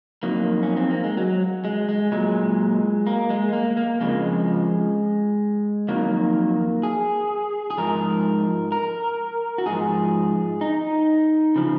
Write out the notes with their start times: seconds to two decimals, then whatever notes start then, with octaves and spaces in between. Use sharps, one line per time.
0.23 F2 D#3 F#3 A#3
0.63 C#4
0.77 C4
0.90 A#3
1.04 G#3
1.17 F#3
1.65 G#3
1.89 G#3
2.12 A#2 F#3 G#3
3.07 A#3
3.30 G#3
3.53 A#3
3.77 A#3
4.01 F2 C#3 F3 G#3
5.88 F2 D#3 F#3 A#3
6.83 G#4
7.70 G#4
7.78 G#2 F3 A#4
8.72 A#4
9.58 F#4
9.66 G#2 F3 G#4
10.61 D#4
11.56 C#3 F3